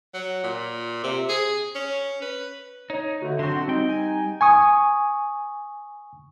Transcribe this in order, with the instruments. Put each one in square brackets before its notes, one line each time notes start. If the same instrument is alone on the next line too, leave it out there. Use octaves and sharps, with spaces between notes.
[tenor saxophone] F#3
A#2
C3
G#4
C#4
B4
[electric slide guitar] D#4 [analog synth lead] C#5
[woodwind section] B2 D3 A3 [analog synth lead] F#4
[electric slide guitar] D3 F#3 C4 [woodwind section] F#4 [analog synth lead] C6
[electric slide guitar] G3 G5 [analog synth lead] C4 [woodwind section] D#4
[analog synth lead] G#5
[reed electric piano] G#5 C#6 D#6